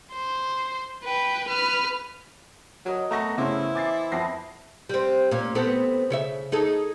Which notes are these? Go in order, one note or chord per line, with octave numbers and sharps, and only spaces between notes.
C5
B4 G5
B4 F6
F#3 A#4 D#5
A3 B3 A#5 C#6 A#6
C#3 A3 C#4 E4 C5
E3 D6 A6 C7
F2 B3 A4 B5 A#6 C7
G3 C4
A#2 C#4
B3 C4 A4
C#3 C#5 E5
D#4 G#4 A4